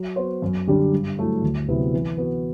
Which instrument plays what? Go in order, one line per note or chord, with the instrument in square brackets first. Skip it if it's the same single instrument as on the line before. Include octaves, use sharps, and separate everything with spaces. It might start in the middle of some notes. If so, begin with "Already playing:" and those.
Already playing: [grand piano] F#3
B3 F#4 C5
F#2
D3 G3 D4 G4
G2
F#3 A3 E4
D2
C3 F#3 B3 E4
E3
B3 F#4